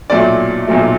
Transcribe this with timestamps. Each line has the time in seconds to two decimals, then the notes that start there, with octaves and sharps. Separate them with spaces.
0.10 B1 A#2 F#3 A3 D5
0.67 B1 A#2 F#3 A3